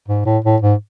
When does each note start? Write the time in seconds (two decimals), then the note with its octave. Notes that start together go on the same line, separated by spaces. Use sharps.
0.08 G#2
0.26 A2
0.44 A2
0.62 G#2